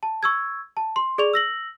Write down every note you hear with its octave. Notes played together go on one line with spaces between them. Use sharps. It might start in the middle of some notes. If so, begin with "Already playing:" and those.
A5
C#6 E6 G#6
A5
C6
G#4 D5 C#6 F7
E6 A#6 F#7